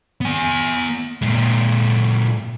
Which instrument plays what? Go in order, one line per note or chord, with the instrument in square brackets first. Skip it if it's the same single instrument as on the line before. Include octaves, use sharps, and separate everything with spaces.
[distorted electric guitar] B3 G#5
A#2 G#3